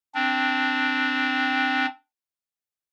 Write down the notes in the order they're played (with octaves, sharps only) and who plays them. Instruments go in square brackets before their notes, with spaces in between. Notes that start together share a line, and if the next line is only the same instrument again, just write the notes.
[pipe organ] C4 D4